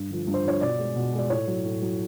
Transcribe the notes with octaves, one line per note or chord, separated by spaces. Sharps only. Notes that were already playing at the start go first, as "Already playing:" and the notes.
Already playing: G2
D3 F3
G2
C5
D3 F3 C#5
B2 D5
G#3
B2
G#3
D5
A2 C#5
F#3
A2
F#3